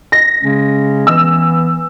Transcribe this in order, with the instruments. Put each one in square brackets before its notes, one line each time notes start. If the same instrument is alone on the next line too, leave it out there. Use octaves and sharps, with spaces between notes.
[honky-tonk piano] A#6
[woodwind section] C#3 G#3 C#4
[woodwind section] E3 B3 [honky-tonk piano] E6